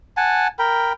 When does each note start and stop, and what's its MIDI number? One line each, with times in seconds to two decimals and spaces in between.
0.17 0.48 78
0.17 0.48 80
0.17 0.48 81
0.59 0.93 70
0.59 0.93 79
0.59 0.93 83